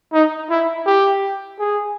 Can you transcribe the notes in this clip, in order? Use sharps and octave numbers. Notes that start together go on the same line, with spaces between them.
D#4
E4
G4
G#4